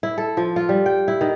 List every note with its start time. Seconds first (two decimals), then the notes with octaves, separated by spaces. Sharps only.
0.03 E4
0.18 A4
0.37 F3
0.56 F4
0.69 G3
0.86 G5
1.08 E4
1.21 D#3